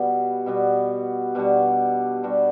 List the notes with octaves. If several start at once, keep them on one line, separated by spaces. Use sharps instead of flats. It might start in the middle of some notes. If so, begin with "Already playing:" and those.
Already playing: B2 G3 B3 F#4
B2 G3 B3 F#4
B2 G3 D4 F#4
B2 G3 D4 F#4